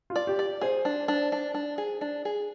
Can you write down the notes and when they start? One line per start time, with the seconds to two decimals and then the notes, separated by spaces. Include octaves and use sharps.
0.10 F4
0.16 D5
0.27 G4
0.39 D5
0.61 G#4 C5
0.85 D4
1.08 D4
1.32 D4
1.54 D4
1.78 G#4
2.01 D4
2.25 G#4